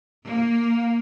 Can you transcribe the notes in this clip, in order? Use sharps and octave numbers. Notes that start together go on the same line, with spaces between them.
A#3